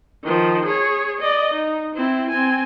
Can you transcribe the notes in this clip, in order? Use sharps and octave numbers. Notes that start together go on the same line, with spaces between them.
D#3 F3
G#4 C#5
D5 D#5
D#4
C4 E4
C4 G#5